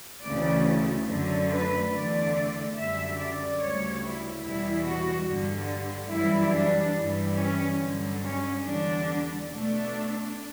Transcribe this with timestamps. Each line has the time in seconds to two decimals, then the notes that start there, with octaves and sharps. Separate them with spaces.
0.23 D2 C#3 E3 A3 D5
1.07 F#2 D3 A3
1.50 B4
1.92 E2 D3 A3 D5
2.76 F#2 D3 G3 E5
3.17 D5
3.59 D2 C#3 G3 C#5
4.02 E4
4.43 E2 B2 G3 E4
4.86 F#4
5.27 G2 D3 G3
6.11 F#2 E3 G3 E4
6.54 D4
6.95 G2 E3 G3
7.38 C#4
7.79 G2 D3 F#3
8.21 C#4
8.62 E2 D3 G3 D4
9.47 B2 A3 D4